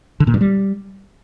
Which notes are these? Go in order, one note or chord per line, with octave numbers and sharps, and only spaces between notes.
D3
A#2
G2
G3